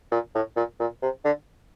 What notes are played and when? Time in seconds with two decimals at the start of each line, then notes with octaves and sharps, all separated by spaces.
0.12 A#2
0.35 A2
0.56 A#2
0.80 A#2
1.02 C3
1.24 D3